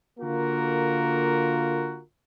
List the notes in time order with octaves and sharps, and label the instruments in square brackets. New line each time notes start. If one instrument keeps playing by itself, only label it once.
[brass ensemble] D3 A#3 F4 F#4 A#4